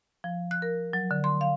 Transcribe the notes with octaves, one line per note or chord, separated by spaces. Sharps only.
F3
F#6
A#4
F#3
D3
C6
F5